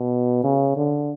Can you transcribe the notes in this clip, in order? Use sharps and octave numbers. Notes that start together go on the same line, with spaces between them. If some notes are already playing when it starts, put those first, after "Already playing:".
Already playing: B2
C#3
D3